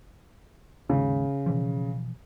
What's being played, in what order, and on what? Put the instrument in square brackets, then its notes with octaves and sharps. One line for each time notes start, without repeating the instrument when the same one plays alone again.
[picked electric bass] D#2 G#2 [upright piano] C#3
[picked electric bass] B2 E3 F3